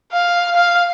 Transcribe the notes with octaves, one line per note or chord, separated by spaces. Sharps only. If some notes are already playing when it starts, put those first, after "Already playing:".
F5
F5